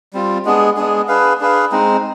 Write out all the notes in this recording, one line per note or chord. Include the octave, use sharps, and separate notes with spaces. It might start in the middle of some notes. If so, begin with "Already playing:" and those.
G3 C4 F4
G#3 B3 D4 G#4
G#3 B3 D4 G#4
D4 G#4 B4 F5
D4 G#4 B4 F5
G#3 C4 D#4